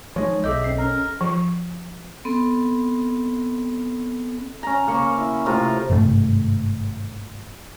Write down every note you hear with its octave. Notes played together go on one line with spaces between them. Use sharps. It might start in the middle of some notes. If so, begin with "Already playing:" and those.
F3 G#3 D#4 C#5
B1 G#4 A4 D#5 E5 D6 G6
C4 C7
C#4 A#4 A#5
F3
B3 C4 A4
C#4 A#5
C#3 A#3 C#6
E4
A2 C3 F4 A#5
G#1 G2 C3 A3